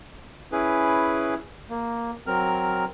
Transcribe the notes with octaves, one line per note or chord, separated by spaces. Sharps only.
C#4 E4 G#4 B4
A#3
F#3 C4 A#4 F6